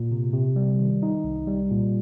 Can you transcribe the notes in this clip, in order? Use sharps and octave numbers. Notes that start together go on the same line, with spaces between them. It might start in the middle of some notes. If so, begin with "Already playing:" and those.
Already playing: A#2
C3
C3
G3
D#3
D#4
C2
G3
A#2